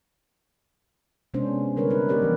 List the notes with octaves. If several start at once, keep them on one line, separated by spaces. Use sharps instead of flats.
C3 G#3 B3 C#4 D4 C5
D3 G3 A#4 B4 C#5
D#4 B4
A3 B3 G4 A#4 C#5 D5
E3 F3